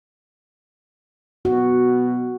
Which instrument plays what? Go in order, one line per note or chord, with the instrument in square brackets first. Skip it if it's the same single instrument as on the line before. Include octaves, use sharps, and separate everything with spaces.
[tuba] B2 [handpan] F#4